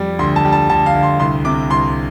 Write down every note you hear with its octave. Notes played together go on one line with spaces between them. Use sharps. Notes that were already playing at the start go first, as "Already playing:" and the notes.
Already playing: F2 G3
D2 C6
A5
G3
A5
D2 A5
F5
D2
C6
C2 C6
C3 D6
C2 C6